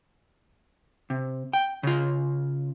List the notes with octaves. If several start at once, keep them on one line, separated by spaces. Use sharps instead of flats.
C3
G5
C#3 F4